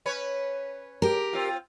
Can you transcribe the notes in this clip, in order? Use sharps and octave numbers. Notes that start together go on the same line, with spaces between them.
C#4 B4 C#5
G4 A#4
C4 F4